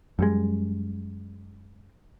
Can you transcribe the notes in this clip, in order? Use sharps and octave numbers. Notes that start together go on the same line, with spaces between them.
F#2 G3 G#3